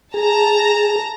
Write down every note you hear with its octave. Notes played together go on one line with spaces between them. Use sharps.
G#4 A5 A#5 A#6